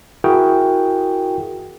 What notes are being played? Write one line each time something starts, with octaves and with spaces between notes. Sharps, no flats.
E4 F#4 G#4 A#4 G5